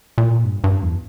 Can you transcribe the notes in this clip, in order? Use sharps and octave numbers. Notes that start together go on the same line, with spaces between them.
A#2
G2
G2
E2